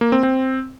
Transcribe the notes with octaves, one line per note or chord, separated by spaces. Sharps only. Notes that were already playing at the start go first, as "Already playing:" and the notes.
A#3
C4
C4